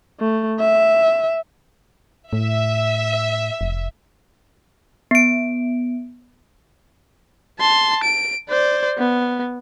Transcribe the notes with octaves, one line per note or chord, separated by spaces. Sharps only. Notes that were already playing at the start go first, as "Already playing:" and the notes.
A3
E5
A2 E5
F1
B3 D7
A5 C6
D7
C5 D5
B3